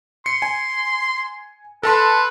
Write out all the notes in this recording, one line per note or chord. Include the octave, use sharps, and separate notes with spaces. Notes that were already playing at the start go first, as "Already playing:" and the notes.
C6 C#7
G#5
A4 B4 A5 C6